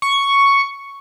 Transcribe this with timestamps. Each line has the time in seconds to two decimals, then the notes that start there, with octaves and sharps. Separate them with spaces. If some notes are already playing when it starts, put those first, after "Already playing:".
0.02 C#6